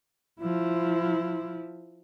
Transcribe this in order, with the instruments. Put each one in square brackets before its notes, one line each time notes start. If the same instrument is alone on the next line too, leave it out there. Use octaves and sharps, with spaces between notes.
[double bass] F3 E4